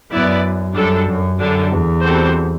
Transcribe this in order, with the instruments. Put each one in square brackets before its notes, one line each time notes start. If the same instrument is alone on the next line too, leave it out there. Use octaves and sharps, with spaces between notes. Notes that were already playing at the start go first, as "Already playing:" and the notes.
[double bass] F#2 [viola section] B3 E4 B4 D5
[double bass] F#2 [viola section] G3 D4 A4
[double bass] F#2
[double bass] F#2 [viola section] D3 G3 D4 A4
[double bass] E2
[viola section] G3 C4 F#4 A4 C5